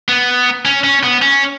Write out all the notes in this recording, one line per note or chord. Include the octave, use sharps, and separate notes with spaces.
B3
C#4
C#4
B3
C#4